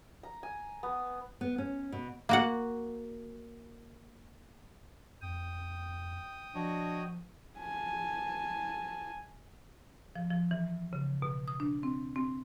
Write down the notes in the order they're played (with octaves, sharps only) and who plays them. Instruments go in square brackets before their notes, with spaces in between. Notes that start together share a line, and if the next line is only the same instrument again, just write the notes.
[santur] A#5
G#5
B3
[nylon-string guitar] B3
C#4
B2
[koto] A#3 F#4 F#5
[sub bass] F2 [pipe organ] G5 D#6
[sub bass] F3 [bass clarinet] D4 [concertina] F#4 C#5 D#5
[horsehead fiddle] G#5 A5
[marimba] F3
F3
E3
C#3
B2
D#6
D4
C4
C4